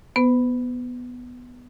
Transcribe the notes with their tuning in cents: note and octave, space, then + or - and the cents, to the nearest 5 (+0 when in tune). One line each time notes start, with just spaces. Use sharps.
B3 +0 B4 +45